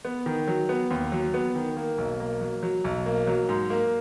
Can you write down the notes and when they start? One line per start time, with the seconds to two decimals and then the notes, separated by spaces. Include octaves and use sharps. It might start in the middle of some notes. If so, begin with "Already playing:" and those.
0.05 B3
0.26 D#3
0.48 F#3
0.69 B3
0.91 D#2
1.12 F#3
1.34 B3
1.55 D#3
1.77 A#3
1.98 B1
2.20 A#3
2.41 F#3
2.63 F#3
2.84 B1
3.06 A#3
3.27 F#3
3.49 G#2
3.70 A#3